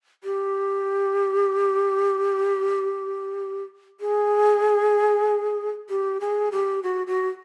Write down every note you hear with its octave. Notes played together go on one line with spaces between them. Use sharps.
G4
G#4
G4
G#4
G4
F#4
F#4